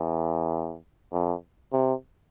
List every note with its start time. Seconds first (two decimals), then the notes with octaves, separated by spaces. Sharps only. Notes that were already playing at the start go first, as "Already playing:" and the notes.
Already playing: E2
1.13 F2
1.73 C3